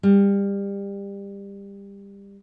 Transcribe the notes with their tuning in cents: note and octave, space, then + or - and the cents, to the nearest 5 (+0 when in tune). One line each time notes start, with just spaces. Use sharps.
G3 +25